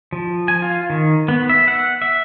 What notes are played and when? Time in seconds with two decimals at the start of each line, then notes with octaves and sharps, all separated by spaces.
0.13 F3
0.48 G#5
0.62 F4
0.90 D#3
1.28 B3
1.50 E5
1.68 F#5
2.02 E5